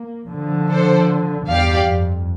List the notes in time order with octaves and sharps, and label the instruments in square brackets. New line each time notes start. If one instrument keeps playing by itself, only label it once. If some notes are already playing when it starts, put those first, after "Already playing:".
Already playing: [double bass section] A#3
D3 F3
[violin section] D4 A4 C5
[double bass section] E2 G2 [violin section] G4 D5 F5
[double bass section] F2